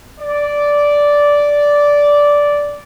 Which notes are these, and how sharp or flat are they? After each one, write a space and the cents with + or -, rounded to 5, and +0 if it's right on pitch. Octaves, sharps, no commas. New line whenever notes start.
D5 -10